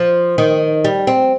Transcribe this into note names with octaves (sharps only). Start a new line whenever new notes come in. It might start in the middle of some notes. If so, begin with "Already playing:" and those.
Already playing: F3
D#3
G3
C4